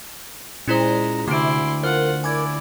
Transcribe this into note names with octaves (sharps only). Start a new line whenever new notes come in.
A#2 G#3 C#4 E4 C5 A#5
D2 C3 E4 C6 D6 D7
F4 A#4 C5 F#5
E4 D5 G#5 D6 G#6